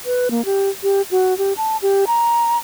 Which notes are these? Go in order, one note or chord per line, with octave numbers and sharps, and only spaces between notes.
B4
A#3
G4
G4
F#4
G4
A5
G4
A#5